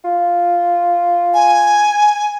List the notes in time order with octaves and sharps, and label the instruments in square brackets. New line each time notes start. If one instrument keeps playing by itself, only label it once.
[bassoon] F4
[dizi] G#5